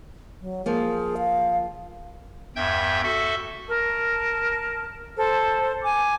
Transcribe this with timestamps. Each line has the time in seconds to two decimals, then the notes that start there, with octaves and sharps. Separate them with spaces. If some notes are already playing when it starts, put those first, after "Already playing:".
0.40 F#3
0.66 F3 A#3 G#4
1.18 F5
2.56 E2 G2 E5 G5 G6 G#6
3.03 F#4 A4 E5
3.68 A#4 A5
5.17 A4 C5
5.84 G#5 D6